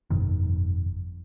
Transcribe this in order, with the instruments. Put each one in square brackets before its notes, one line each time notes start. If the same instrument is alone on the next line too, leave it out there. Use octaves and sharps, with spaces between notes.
[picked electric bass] G1 F2 B2 D#3